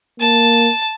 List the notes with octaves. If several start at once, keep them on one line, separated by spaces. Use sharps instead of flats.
A#3 A5